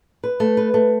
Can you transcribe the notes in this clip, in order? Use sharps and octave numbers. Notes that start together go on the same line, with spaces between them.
B4
A3
B4
A3